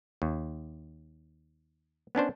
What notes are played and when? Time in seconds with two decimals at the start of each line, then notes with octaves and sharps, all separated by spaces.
0.22 D#2
2.15 B3 C#4 D4 C5